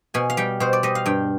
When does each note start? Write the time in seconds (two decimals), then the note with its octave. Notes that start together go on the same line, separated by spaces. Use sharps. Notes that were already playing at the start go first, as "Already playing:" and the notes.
0.14 B2 G#5
0.30 F5
0.37 G3 G5
0.60 B2 C5
0.73 D5
0.83 G3 D#5
0.95 F5
1.06 G2 G5